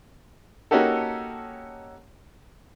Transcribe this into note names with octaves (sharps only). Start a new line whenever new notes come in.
A#3 C#4 D#4 F#4 G4 A4